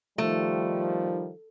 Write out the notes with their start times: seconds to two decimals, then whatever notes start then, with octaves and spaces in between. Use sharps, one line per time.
0.18 D#3 F3 G3 A3